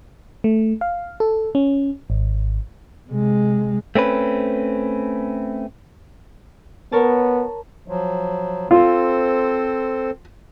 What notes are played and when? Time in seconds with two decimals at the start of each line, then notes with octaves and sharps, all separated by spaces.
0.44 A3
0.81 F5
1.20 A4
1.55 C#4
2.10 G#1
3.09 C3 G#3
3.96 A3 C4 C#4 B4
6.92 B3 A#4 C#5 A5
7.88 F3 F#3
8.71 C4 F4 A4 C5